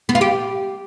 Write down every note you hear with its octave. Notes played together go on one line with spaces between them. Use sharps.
B3
F4
G4